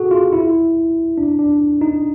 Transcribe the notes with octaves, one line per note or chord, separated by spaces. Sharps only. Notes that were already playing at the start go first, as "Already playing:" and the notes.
Already playing: F#4 G#4 A4
F4
E4
D4
D4
D#4